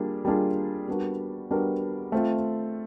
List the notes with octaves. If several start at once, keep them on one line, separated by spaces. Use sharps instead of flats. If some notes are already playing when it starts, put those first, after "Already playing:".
Already playing: G3 A#3 D4 F4 G#4
G3 A#3 D4 F4 G#4
G3 B3 D4 F#4 A#4
G3 B3 D4 F#4 A#4
A3 C4 F4